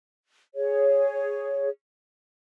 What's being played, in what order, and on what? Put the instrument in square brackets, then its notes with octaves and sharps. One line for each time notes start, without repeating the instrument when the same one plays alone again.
[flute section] G#4 C#5